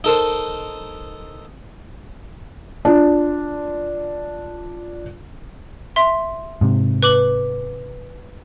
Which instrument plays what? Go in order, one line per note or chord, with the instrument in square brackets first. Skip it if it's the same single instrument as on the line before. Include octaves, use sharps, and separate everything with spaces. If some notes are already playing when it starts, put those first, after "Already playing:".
[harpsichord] D#4 A4 A#4 C5
[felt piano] D4 F4
[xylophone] E5 C6
[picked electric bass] G#2 C3
[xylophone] B4 D6 F#7